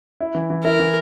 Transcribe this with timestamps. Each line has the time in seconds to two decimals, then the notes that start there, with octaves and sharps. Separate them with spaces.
0.20 E4
0.35 E3
0.50 E3
0.64 E4 A#4
0.80 E3